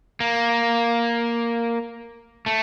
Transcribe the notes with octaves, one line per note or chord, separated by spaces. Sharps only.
A#3
A3